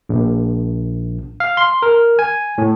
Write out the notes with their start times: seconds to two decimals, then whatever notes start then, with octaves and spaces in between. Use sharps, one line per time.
0.09 A#1
1.40 F5
1.57 C6
1.82 A#4
2.19 G#5
2.58 A2